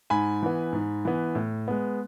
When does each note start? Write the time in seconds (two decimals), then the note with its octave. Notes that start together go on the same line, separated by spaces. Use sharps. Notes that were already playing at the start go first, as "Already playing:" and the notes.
0.10 G#2 G#5 B5
0.42 E3 B3
0.73 G#2
1.05 E3 B3
1.35 A2
1.68 G#3 B3